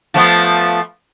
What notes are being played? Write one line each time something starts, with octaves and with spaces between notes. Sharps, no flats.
F3 A3 B3